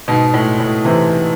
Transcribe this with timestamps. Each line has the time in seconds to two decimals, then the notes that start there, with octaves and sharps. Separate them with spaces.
0.08 G#2 B2
0.34 A2
0.60 A2
0.85 C3 E3